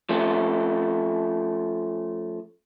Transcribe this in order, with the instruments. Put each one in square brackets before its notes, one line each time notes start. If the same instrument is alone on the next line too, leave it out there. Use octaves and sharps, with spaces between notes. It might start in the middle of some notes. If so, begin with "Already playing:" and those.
[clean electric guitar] F3 A3 C#4